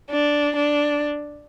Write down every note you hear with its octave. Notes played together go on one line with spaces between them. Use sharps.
D4
D4